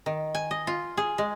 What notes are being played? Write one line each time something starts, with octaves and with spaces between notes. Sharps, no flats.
D#3
G#5
D#5
F4
G#4
G#3